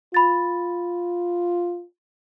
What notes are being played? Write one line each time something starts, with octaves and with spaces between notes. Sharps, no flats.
F4 B5 A6